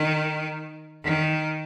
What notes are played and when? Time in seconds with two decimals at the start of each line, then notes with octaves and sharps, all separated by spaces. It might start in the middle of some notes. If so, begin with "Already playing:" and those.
Already playing: D#3
1.04 D#3